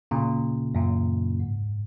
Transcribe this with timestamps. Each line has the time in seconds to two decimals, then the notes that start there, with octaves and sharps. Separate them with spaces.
0.11 A#2 C#3
0.75 F#2 A#2
1.40 G#2